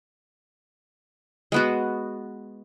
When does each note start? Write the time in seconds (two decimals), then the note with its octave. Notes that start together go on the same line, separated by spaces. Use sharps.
1.52 G#3 B3 F#4